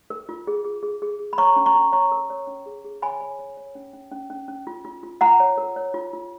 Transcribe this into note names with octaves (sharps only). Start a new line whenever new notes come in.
A#4
F4
G#4
G#4
G#4
G#4
G#4
B5
C#5 A#5 C#6
C#4
A#5 C#6
C#4
C#5 A#5 C#6
A#4
C#5
C#4
G#4
G#4
C#5 G#5 B5
C#5
C#5
C#5
C#4
C#4
C#4
C#4
C#4
F4
F4
F4
F4 F#5 A#5
C#5
A#4
C#5
F4
F4